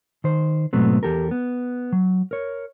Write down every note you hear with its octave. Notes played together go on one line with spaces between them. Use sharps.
D#3 C5
G#2 B2 F#3 A3 B3 C4
E2 G4 A4 A#4
B3
F#3
A#4 C#5